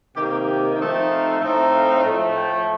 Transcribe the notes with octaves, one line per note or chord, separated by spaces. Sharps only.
C3 D#3 A#3 G4
G4
F3 A3 C4 D#4
F5
A2 A3 C4 D#4
F5
A2 F3 A3
G5